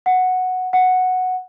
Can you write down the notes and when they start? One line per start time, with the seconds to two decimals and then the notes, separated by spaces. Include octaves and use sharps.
0.06 F#5
0.73 F#5